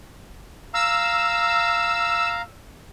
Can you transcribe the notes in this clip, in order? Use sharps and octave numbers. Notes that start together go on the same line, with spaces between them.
F5 A#5 E6